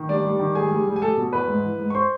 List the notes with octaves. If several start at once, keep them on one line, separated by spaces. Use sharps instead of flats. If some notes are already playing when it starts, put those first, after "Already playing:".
Already playing: D#3
G3 D4 D5
G3
D#3
G3 G#4 G#5
G3
G3
G#5
G3 A4 A5
B2
E2 B4 B5
G#2
E3
G#2
C#6
C5 C6